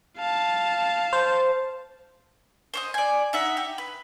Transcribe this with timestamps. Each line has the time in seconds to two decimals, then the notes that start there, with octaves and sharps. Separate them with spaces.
0.17 F5 A5
1.13 C5
2.74 C5 C#5 D#5
2.94 D5 G#5
3.33 D#4 E5 F#5
3.57 G4
3.78 B4